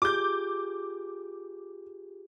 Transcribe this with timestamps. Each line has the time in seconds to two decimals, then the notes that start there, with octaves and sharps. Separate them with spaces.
0.02 F4 G4 G#4 D6 G6